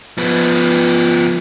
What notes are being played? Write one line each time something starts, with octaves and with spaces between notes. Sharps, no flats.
F3 B3